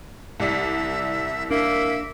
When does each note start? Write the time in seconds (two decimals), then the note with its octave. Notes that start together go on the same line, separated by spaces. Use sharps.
0.40 C2 D5 E5 B6
1.51 A#3 D4 E5